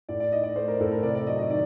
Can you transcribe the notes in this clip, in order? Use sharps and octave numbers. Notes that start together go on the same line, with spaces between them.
A2 D5
D5
D#4 D#5
D5
A3 C5
A#4
A2 A4
A#4
C3 D5
D5
F#3 D#5
D#5
D#3 D5